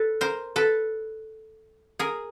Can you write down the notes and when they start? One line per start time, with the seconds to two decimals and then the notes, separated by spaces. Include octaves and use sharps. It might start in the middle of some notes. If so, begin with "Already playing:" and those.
Already playing: A4 B4
0.21 A#4 C5
0.56 A4 B4
1.99 G#4 A#4